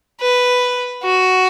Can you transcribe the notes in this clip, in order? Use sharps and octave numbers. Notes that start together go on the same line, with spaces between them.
B4
F#4